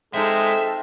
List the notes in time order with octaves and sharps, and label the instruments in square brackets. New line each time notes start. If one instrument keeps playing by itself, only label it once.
[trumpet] G#3 [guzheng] C4 D#4 F4 [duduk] A4 [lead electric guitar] E5